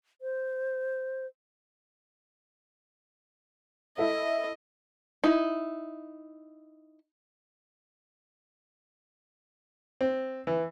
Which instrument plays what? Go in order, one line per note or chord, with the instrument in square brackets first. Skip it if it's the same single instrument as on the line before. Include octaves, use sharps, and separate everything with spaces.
[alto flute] C5
[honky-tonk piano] E4 A4 E5 [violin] D#5
[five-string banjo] D#4 E4
[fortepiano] C4
E3